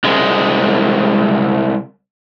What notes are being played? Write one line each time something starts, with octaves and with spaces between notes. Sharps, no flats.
C2 G#3